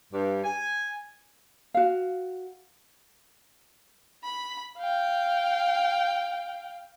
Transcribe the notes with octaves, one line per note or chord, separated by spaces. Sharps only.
G2
G#5
F#4 F5
B5
F5 G5